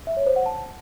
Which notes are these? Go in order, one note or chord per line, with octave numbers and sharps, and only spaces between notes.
E5
C#5
C5
F#5
A5